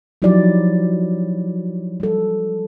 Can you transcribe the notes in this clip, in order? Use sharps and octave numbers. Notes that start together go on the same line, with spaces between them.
F3 F#3 D#4 E4 G4 D5
G3 A4